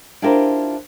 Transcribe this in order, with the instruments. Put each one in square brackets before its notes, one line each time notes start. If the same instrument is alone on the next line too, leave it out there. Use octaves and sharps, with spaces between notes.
[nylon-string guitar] D4 E4 F4 G4 A#4 C5